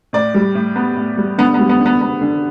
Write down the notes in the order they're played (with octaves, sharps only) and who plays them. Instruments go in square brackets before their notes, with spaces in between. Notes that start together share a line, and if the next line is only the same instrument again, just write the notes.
[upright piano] A2 D5
G3
A2
B3
A2
G3
D3 B3
B3
G3
B3
D3
B3
B3
D3